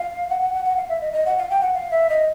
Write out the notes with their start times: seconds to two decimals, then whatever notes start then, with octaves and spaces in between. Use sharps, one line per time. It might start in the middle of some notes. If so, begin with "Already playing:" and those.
Already playing: F5
0.30 F#5
0.42 F#5
0.54 F#5
0.65 F#5
0.77 F5
0.89 E5
1.01 D#5
1.13 D#5
1.26 F#5
1.38 F5
1.50 G5
1.61 F#5
1.74 F5
1.91 E5
2.10 D#5